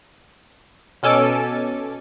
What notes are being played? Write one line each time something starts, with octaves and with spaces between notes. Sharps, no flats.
B2 C#4 A4 G#5 D6 A6